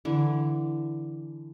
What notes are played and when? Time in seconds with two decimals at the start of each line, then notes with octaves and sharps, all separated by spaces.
0.05 D3 E3